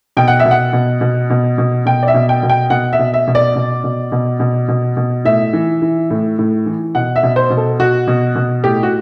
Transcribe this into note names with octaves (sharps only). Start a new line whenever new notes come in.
B2 G5
F#5
E5
B2
F#5
B2
B2
B2
B2
B2 G5
D5
E5
B2
G5
B2
G5
B2 F#5
E5
B2
E5
B2
D5
B2
B2
B2
B2
B2
B2
A2 E5
E3
E3
A2
A2
E3
B2 F#5
E5
B2
C5
B2
A4
B2 F#4
B2
B2
A2 G4
F#4